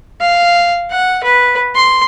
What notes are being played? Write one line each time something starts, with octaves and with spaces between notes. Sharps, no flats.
F5
F#5
B4
C6